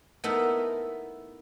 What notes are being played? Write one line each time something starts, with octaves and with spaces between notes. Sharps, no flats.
A3 B3 D#4 E4 A#4